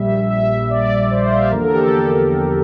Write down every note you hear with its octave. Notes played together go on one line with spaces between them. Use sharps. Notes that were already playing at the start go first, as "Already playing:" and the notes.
Already playing: A#1 A#2 G3 E5
E5
D5
C5
F5
E5
E2 D3 F3 A#3 A#4
A4
G4
A4